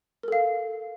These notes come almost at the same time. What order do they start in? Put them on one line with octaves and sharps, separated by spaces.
A#4 A4 F5